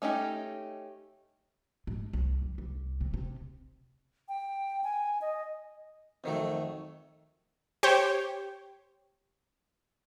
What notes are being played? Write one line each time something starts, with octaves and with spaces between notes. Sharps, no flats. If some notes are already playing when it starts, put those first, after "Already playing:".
A3 C#4 D#4 G4
G#2
C2
F2
C2
C3
C3
G5
G#5
D#5
F2 D#3 F#3 A3
G4 C5 C#5 G5